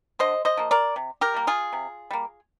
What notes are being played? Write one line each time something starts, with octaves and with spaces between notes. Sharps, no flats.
D3 C5 D#5
C5 D#5
F3 A#3
A#4 D5
C3
G4 A#4
G3 A#3
F4 G#4
C3
G3 A#3